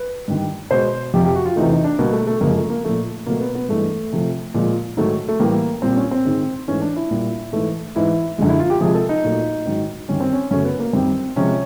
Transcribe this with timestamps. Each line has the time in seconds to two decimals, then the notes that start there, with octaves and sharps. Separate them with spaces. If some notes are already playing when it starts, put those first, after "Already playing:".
Already playing: B4
0.28 G2 D#3 G3
0.71 B2 G#3 C5
1.14 F2 C3 F3 G4
1.24 G4
1.36 F#4
1.46 F4
1.56 E2 C3 E3 A3 D#4
1.71 D#4
1.84 D4
1.99 B2 G3 A#3
2.13 A3
2.27 A3
2.41 F#2 C#3 F3 G#3 A#3
2.56 A3
2.70 A#3
2.85 A#2 F3 A3
3.26 B2 F#3 A3 A#3
3.41 B3
3.55 B3
3.69 G2 E3 G#3 A3
4.13 C3 F3 A3
4.54 A#2 F3 G#3
4.97 G#2 D#3 F#3 A3
5.29 A3
5.39 A2 E3 G3 A#3
5.82 A#2 G3 C4
5.96 C#4
6.11 C4
6.25 G#2 D#3 G#3
6.68 G#2 E3 A3 C#4
6.82 D4
6.96 E4
7.11 A#2 G3
7.52 G#2 E3 A3
7.95 G#2 E3 G#3 E4
8.38 F#2 D3 F3 G#3
8.49 E4
8.60 F4
8.70 G4
8.80 C3 F3 G#3 G#4
8.95 A4
9.09 D#4
9.24 A#2 F#3 A3
9.65 G#2 D#3 F#3
10.09 F#2 D#3 G3 C#4
10.21 C4
10.33 C#4
10.51 F#2 C#3 F#3 A3 C#4
10.65 B3
10.80 A#3
10.93 F#2 D#3 G3 C4
11.36 C3 F3 G#3 C#4